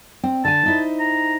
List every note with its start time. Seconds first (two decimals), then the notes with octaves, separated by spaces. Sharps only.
0.23 C4
0.45 D3 G#5 A5
0.66 D#4 E4 C5
1.00 A#5